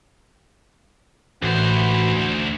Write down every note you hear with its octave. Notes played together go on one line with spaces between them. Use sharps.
A1 D2 E3 F#4 B4 C5